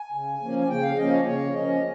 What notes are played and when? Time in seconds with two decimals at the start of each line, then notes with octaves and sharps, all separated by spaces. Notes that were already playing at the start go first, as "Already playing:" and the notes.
Already playing: G#5
0.12 C#3
0.41 F3 A#3 C#4
0.59 G#5
0.68 C#3 G5
0.83 F5
0.97 F3 A#3 C#4 D#5
1.11 C#5
1.25 C#3 C#5
1.53 F3 A#3 C#4 D#5